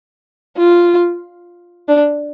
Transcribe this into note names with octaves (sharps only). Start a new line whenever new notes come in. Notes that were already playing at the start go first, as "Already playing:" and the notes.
F4
D4